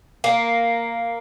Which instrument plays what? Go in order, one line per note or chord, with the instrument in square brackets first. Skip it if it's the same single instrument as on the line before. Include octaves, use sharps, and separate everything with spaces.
[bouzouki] A#3